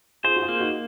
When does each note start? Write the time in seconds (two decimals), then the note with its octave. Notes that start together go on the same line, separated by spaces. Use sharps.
0.24 F4 G#4 C5
0.37 F#4
0.42 F4 G#4
0.48 A#3
0.60 D#4 F#4